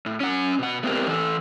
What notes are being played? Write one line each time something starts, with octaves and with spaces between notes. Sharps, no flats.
A2
C#4 F#5
B2 F#5
A3 B3 C4 G4 A#4
E3 A4